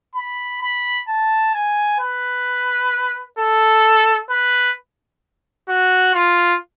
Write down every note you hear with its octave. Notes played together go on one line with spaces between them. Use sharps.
B5
B5
A5
G#5
B4
A4
B4
F#4
F4